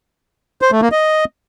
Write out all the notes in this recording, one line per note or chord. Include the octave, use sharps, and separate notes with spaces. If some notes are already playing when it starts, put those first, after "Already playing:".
C5
A3
A#3
D#5